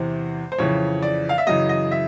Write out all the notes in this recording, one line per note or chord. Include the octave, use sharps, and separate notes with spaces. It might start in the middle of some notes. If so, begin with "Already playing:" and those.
Already playing: E2 C3 E3 C5
C5
F2 C#3 E3 C#5
D5
F5
E5
F#2 C#3 E3 D#5
D#5
E5